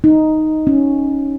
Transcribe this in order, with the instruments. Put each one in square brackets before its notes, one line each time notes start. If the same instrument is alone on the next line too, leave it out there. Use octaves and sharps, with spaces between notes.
[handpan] D#4
C#4